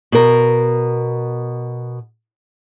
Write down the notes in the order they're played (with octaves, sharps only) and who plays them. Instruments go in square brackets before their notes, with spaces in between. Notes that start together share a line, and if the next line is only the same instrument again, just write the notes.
[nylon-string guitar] B2 A#4